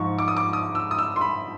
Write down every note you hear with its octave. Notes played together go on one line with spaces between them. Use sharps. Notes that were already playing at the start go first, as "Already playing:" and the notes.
Already playing: G#2 F3 C#6
D6
D#6
D6
D#6
E6
D#6
E6
C6
B5